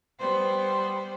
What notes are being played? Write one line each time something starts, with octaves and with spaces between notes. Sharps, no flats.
G3 B3 C5